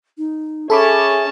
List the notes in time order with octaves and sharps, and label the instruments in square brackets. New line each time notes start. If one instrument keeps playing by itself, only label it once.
[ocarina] D#4
[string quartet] C#4 C#5 A5 [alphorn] G#4 [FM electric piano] A4 B5 D6 [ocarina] E5